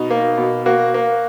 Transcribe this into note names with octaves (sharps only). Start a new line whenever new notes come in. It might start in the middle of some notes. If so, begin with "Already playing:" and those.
Already playing: B2 D#4
A#3
B2
A#3 F#4
A#3